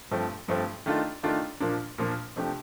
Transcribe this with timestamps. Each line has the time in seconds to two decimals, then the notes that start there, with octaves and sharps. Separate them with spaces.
0.11 G2 F3 A3 C4
0.48 G2 F3 A3 C4
0.86 D#3 A3 D4 F4
1.23 D#3 A3 D4 F4
1.60 A#2 F3 A#3 D4
1.98 A#2 F3 A#3 D4
2.36 C3 F3 A3 D4 G4